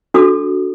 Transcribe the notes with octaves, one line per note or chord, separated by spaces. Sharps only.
D4 F#4 A4 D#6